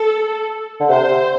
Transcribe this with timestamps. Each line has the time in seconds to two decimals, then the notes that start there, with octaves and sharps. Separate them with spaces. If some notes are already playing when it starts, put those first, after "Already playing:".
Already playing: A4
0.80 D3
0.89 C3 C5